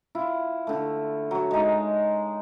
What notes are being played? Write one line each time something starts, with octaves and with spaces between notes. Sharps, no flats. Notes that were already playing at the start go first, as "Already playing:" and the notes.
E4 F4
D3 A3
F#3 C#5
G#3 D#4